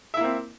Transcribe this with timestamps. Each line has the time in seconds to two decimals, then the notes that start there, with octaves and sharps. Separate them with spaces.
0.14 E5
0.17 E4
0.21 A#3
0.24 C4